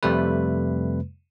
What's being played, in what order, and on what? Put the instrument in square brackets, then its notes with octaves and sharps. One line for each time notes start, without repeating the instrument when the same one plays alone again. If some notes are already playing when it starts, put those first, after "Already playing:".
[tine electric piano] F2 C3 G3 A3 B4